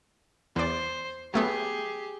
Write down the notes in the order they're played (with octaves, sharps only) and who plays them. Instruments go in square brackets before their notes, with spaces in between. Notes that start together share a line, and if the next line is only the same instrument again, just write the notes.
[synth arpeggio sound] E2 D5 [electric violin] C5
[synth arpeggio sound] F#3 A3 B3 [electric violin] G4 G#4